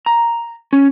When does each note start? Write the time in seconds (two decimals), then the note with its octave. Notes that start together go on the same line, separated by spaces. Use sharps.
0.06 A#5
0.73 C#4